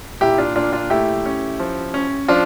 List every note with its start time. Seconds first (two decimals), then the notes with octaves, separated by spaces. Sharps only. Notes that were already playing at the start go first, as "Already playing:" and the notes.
0.21 A#2 E4 G4
0.38 D4 F4
0.56 A#2 D4 F4
0.73 D4 F4
0.90 A3 E4 G4
1.26 C#4
1.59 F3
1.94 C#4
2.28 F3 D4 F4